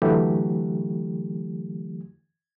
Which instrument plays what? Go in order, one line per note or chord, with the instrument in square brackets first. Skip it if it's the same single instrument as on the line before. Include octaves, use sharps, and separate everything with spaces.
[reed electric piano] D3 E3 F#3 A3 G4